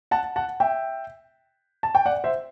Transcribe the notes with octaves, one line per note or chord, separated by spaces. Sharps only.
F#5 A5
F#5 A5
E5 G5
A5
G5
D5 F#5
C5 E5